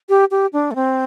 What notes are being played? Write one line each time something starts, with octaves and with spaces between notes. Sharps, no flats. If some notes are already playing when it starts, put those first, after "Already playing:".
G4
G4
D4
A3
C4